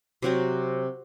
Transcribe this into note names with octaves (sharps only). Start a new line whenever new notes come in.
C3 F#3 C4 F#4